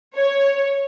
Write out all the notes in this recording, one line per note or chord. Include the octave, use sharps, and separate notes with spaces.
C#5